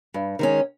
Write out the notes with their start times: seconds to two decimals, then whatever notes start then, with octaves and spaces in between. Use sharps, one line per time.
0.14 G2
0.39 D#3 G#3 C#4